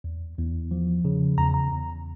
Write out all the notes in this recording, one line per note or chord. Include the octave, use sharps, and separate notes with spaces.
E2
E2
F3
C#3
E2 A#5
A#5
E2